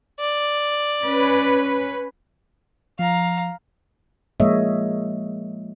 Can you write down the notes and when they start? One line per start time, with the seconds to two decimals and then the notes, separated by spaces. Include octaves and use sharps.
0.20 D5
1.03 C#4 B4
2.99 F3 F5 A#5
4.40 F3 G#3 A#3 C#5 D#5 E5